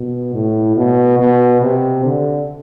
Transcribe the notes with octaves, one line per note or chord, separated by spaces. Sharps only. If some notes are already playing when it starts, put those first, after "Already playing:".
Already playing: B2
A2
B2
B2
C3
D3